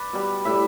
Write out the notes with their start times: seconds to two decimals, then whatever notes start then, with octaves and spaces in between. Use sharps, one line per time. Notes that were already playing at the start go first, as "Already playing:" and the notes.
Already playing: B4 D5
0.13 B2 G3
0.45 A2 G3 E5